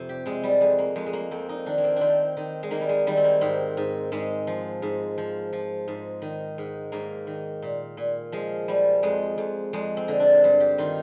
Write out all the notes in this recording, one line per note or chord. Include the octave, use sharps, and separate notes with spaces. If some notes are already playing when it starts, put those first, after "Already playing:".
Already playing: F2 C3
G4
C3 G#3
G3
F2 G#3
A#3
F2 G#3
G#3
A#3
F2 C4
D#4
D#3 D4
A#3
C4
D#3 C4 D4
D#3
G#3
D#3 A#3
G3
G#3
D#3 G3
C4
A#3
G#2 C4
G#2
G#2 G#3
F3
G#2
F3
F3
G#2
D#3
G#2
G#2 A#3
D#3
A#2
A#2
F3 G#3
F3 G3
F2 G#3
F2
F2 G#3
C4
D3
D4
G2
G4
D#3 F4